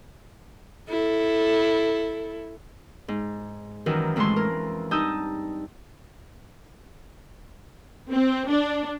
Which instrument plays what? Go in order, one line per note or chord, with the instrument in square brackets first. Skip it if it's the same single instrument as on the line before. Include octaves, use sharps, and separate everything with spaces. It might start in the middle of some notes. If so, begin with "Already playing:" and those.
[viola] E4 A4
[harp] G#2
F#2 D#3 E3 A#4
F2 A2 E3 G#3 C#4 C6
A#4
G2 D#4 A5 D#6 E6 G6
[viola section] C4
D4